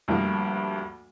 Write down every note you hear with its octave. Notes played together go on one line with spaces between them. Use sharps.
D2 G2 F3 A#3